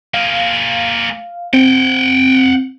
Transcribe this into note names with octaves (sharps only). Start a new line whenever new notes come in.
A#3 G#4 F5
C4 F#5 G5